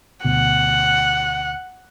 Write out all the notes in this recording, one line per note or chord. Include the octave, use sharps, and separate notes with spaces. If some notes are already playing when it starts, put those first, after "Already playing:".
D2 B2 F#5